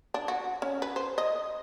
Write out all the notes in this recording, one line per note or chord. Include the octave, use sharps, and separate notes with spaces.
D4
F#4
C#4
B4
C5
D#5